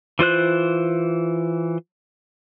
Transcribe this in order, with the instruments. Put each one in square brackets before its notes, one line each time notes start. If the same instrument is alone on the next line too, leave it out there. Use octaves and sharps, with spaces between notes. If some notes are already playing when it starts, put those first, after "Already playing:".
[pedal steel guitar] E3 F4 C5 F#6